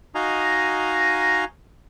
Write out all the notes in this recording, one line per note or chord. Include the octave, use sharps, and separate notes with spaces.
D#4 F#4 D#5 F5 G#5 A#5